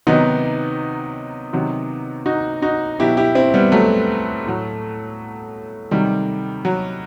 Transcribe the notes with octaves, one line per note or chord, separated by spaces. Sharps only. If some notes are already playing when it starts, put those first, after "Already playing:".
C3 D#3 F#3 B3 D#4
C3 D#3 F#3
D#4 F#4
D#4 F#4
B2 F#3 E4 G4
E4 G4
C4 E4
G3 B3
F#3 A3
A2 F#3
C3 D#3 F#3 G3
F#3